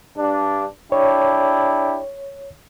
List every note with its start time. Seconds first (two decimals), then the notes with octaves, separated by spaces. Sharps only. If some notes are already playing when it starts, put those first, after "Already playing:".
0.18 G2 D4
0.92 D4 E4 G4 C#5